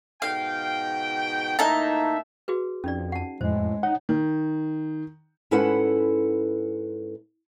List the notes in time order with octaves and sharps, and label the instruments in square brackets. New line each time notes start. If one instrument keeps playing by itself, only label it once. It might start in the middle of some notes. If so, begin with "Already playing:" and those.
[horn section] G#2 B2 G5 [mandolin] F5
[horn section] A2 A#3 E5 [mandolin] D#4 A5
[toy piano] F#4 G#4 B4
[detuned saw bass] F2 [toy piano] C#4 D#4 D5
[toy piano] F#5 A5
[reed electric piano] F2 [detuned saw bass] A2 [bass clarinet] G#3 [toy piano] C5
[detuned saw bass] D#4 [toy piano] C#5 [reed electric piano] F#5
[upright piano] D#3
[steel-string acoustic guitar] G#2 C#4 E4 A4 B4 F#5